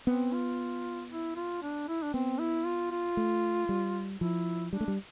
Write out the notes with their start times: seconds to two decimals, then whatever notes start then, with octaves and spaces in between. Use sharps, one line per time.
0.07 B3 C4
0.34 F4
1.11 E4
1.36 F4
1.62 D4
1.89 E4
2.03 D4
2.14 B3 C4
2.39 E4
2.66 F4
2.92 F4
3.17 A3
3.69 G3
4.20 F3 E4
4.72 G3 D4
4.81 A3
4.88 G3